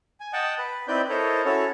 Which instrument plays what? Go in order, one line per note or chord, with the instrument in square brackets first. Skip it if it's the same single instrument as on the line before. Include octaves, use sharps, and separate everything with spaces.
[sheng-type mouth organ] G#5
D#5 F#5 G5 A5
B4
C4 D#4 E4 B4 D5 G6
E4 A4 A#4 C5 C#5 D#5
C#4 E4 F#4 A4 C#5